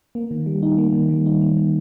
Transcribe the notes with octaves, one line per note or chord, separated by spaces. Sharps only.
A#3
D#3
G3
D#4
A#3
D#3
G3
D#4
A#3
D#3